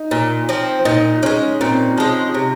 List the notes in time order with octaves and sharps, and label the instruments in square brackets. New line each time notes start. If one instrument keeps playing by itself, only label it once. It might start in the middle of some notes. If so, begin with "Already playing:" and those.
Already playing: [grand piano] D#4
[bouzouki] A#2
F3 C4
[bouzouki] A#2 [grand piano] D#4
[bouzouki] F3 [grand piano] C#4
[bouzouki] G#3
[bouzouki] A#2 [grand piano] C4
[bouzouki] F3 G#3
C3